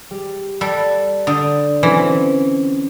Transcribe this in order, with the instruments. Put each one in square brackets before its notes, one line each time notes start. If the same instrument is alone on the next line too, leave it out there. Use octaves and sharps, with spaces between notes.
[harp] G3
[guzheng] G3 A4 [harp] F#6
[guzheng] D3 [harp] D#6 G6
[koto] E3 [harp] F#3 C4 C#4